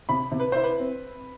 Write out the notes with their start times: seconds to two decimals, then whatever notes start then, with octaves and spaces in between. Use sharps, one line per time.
0.09 C3 B5
0.32 C3
0.40 B4
0.52 E4 C5
0.63 B4
0.79 C4